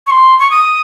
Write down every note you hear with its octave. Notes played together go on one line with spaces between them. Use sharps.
C#6
C6
C#6
D#6